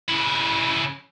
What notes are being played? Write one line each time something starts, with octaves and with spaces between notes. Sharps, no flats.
C#3 E4